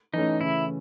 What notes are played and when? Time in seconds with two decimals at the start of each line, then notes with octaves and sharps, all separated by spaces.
0.13 E3 A3 C#4 D#4
0.41 C#3 E4